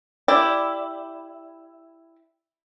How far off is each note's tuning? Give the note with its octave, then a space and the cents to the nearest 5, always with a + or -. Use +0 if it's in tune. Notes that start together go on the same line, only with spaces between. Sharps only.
E4 +5 G4 +5 D5 +0